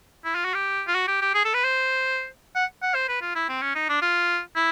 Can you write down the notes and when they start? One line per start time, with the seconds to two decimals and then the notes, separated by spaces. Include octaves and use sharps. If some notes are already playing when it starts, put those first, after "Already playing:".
0.24 E4
0.35 F4
0.45 F#4
0.54 G4
0.87 F4
0.94 F#4
1.07 G4
1.21 G4
1.34 G#4
1.45 A4
1.54 B4
1.64 C5
2.55 F#5
2.82 F#5
2.94 C5
3.08 B4
3.21 F4
3.35 E4
3.49 C4
3.62 C#4
3.75 D#4
3.89 D4
4.02 F4
4.55 E4